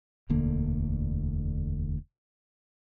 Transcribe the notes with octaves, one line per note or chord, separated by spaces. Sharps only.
E1 D2 D3 A#3